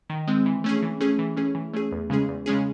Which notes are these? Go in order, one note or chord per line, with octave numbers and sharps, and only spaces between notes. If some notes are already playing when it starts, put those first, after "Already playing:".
D#3
G#3 C4
E3
A3 C#4 G#4
E3
A3 C#4 G#4
E3
A3 C#4 G#4
E3
A3 C#4 G#4
E2
C#3 G#3 C#4 G#4
E2
C#3 G#3 C#4 G#4